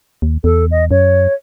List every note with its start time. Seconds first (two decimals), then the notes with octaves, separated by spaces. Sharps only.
0.22 D#2
0.44 E2 A4
0.71 D#5
0.91 F#2 C#5